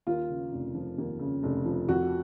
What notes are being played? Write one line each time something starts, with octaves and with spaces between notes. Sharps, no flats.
D#2 F4
C#3
F1
F3
D#2
C#3
F1
F3
F2 F#4